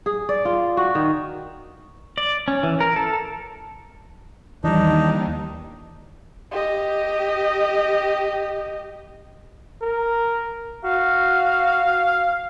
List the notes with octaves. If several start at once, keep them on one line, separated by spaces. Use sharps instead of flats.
G#4
D5
F4
F#4
D#3
D5
C#4
E3
A#4
A4
D#2 D#3 E3 G3 D4 D#4
G4 D#5
A#4
F#4 F5